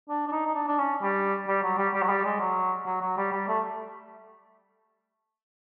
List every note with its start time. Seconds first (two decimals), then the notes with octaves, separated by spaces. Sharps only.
0.09 D4
0.27 D4
0.32 D#4
0.46 D#4
0.55 D4
0.67 D4
0.78 C#4
1.02 G3
1.47 G3
1.63 F#3
1.78 G3
1.94 G3
2.02 F#3
2.09 G3
2.25 G#3
2.39 F#3
2.86 F#3
3.01 F#3
3.17 G3
3.32 G3
3.48 A3